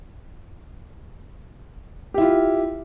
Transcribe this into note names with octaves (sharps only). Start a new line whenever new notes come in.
E4 F4 G4